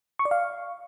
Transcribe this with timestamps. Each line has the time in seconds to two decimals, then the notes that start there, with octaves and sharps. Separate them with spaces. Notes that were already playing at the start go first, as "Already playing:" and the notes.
0.19 C#6
0.25 D5
0.31 F5